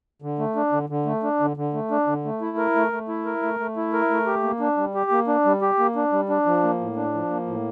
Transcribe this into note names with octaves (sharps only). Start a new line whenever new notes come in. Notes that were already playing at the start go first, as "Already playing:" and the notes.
D3
A3
D4
D3
D3
A3
D4
D3
D3
A3
D4
D3
A3
E4
A#4
A3
A3
E4
A#4
A3
A3
E4
A#4
A3
G4
A#3
D4
G3
G4
A#3
D4
G3
G4
A#3
D4
G3
D4
F3
A#3
A2
D4
F3
A#3
A2